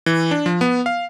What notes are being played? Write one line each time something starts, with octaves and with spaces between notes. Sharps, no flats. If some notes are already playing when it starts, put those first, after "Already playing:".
E3
D4
F3
B3
F5